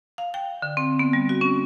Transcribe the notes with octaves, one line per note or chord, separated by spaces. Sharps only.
F5
G5
D3
C4
B3
G3
F#4
C#4